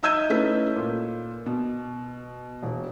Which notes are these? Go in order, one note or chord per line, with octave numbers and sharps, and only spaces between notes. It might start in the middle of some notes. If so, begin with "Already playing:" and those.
D#4 E5 E6 G6 G#6 D#7
A3 C#4 D#4 E4 A4 B4
A#2
B2
E1